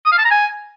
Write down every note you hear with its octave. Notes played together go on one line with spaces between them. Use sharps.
D#6
F5
A5
A#5
G#5